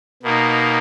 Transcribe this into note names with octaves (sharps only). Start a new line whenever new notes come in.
B2 A#3 D#4